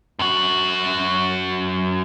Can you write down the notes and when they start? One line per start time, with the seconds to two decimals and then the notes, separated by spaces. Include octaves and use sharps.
0.19 F#2 F#4